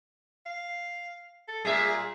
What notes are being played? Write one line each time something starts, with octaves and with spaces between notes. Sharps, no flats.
F5
A4
A#2 G3 G#4 E5